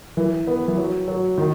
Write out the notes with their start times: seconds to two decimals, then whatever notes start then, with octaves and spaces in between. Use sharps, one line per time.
0.17 E3
0.47 B3
0.68 E3
0.77 F#3
1.08 F#3
1.38 D#3